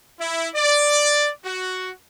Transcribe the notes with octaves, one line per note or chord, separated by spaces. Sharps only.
E4
D5
F#4